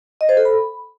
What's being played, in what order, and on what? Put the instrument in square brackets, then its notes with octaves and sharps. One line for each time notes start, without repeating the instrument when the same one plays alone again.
[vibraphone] D#5
C5
A4
B5